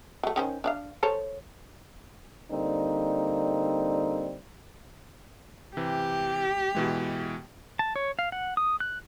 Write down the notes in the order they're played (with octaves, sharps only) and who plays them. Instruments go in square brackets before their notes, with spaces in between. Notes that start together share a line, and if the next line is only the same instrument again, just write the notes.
[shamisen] F#3 A3
D#3 C#4 C5
D4 D5 F5
A4 C5 C#5
[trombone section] D3 G3 A#3 C4 D#4
[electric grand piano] C3 E3 [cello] G4
[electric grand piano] B2 E3 G#3
[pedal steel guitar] A5
C#5
F5
F#5
D#6
F#6